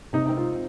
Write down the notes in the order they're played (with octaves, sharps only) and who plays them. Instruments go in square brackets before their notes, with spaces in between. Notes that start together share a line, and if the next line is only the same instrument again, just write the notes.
[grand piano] C3 [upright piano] D#4
[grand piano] C4 [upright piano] D#4
[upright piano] F4